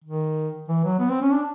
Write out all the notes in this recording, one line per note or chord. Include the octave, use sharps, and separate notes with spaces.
D#3
E3
F#3
B3
C4
C#4
D4